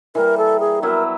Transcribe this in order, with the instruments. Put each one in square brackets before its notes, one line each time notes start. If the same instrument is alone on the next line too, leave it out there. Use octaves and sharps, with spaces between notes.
[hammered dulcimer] E3 G3 A#3 [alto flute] A#4
[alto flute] A4
G#4
[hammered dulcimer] F#3 B3 E4 [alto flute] A#4